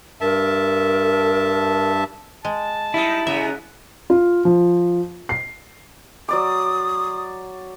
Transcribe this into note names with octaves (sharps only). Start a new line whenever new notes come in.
G2 A#4 E5 A5
G#3 A5
G3 D#4 E4
C#3 B3 E5 A#5
F4
F3
C7
F#3 D5 D6 D#6